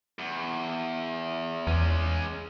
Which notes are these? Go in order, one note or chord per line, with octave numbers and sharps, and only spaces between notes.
E2
E2 G#3 C#4